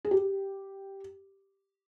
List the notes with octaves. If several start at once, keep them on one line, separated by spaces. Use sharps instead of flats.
G#4
G4